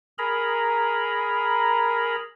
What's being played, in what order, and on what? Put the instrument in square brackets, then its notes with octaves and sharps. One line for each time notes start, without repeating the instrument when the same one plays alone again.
[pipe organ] G#4 A#4 A#5 B5